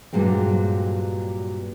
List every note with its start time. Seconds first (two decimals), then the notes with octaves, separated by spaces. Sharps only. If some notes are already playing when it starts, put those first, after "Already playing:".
0.13 G2 A#2 F#3 G#3 C4